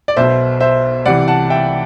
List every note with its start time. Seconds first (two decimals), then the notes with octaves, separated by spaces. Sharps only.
0.08 D5
0.16 B1 B2 C5 E5
0.60 C5 E5
1.05 C2 C3 E3 D5 F#5
1.28 F#5 A5
1.50 E5 G5